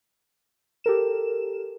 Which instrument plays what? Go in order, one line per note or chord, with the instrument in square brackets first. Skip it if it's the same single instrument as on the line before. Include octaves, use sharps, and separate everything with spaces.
[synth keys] G4 A4 A#4 E7